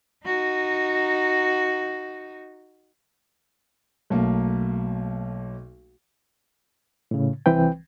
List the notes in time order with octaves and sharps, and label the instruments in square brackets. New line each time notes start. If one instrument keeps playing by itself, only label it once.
[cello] D#4 F#4
[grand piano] B1 A3 A#3
[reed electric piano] A2 C#3
C2 E3 C4 B4 G5